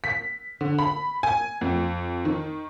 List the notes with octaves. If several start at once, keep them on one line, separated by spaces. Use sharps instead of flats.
B6
D3
B5
G#5
F2
D#3